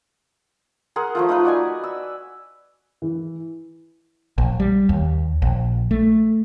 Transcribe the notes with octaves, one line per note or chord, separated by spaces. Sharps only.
G#4 A#4 F#5 C6
F3 A3 F4
A3 D#4 F4 B4
F#4 D5 D#5 G#5
E6
E3
A#1
G3
D#2
A#1
A3